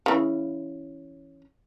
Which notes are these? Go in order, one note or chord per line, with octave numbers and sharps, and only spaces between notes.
C#3 E3